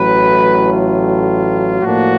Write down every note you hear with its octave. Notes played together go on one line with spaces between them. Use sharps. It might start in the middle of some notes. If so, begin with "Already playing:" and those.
Already playing: A1 A2 F#3 B4
F4
A2 F3 A#3 D4 F#4